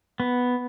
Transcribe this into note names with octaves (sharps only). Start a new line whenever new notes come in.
B3